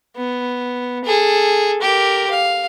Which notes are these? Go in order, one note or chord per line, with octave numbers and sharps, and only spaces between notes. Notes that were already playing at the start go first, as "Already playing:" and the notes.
B3
G#4 A4
G4 A#4
F5